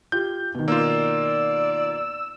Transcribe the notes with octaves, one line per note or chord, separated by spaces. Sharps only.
F4 G4 G6
B2 D#3
A#3 F4 D5 E6